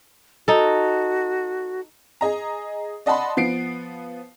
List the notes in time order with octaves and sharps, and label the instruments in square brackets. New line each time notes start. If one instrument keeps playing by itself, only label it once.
[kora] D#4 A4 [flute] F#4
[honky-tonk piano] G#4 D#5 A#5
D5 D#5 F#5 A5 B5 C6
F3 B3 C7 D7